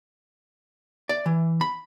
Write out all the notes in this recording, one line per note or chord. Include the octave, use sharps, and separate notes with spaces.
D5
E3
B5